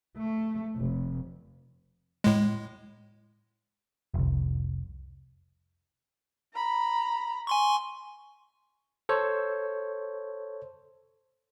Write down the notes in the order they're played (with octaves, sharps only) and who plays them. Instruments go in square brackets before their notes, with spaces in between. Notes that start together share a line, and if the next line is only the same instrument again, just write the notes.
[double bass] A3
F1
[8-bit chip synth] A2 G#3
[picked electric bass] F1 C2
[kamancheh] A#5 B5
[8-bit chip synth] G#5 C6 C#6
[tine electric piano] A4 C5 C#5